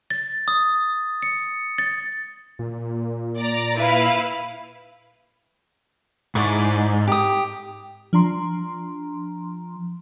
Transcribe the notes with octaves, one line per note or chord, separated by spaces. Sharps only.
A6
D#6
C#7
A6
A#2
D5 A#5
E4 B4 F5
G#2 E4 D5 C#6
G4 D#6
F3 D4 A#5 C6